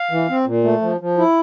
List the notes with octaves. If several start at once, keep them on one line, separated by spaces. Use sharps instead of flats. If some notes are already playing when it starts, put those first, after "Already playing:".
Already playing: F5
E3
C4
A#2
A3
F3
F3
E4